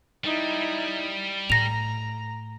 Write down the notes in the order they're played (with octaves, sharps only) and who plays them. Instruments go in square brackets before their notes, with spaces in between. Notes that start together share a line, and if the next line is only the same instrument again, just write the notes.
[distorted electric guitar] G3 [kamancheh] D#4 E4
[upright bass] A2 [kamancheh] A#5 [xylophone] A#6 F7